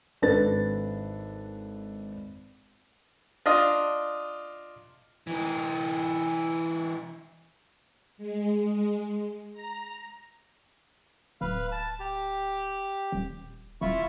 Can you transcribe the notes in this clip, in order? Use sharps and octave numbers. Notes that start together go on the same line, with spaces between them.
G#1 D4 A4 B4 A6
D4 F4 D#5
E3 D#4
G#3
A#5
D1 B4 F5
A5
G4
D#1
D#1 E4 F4 C#6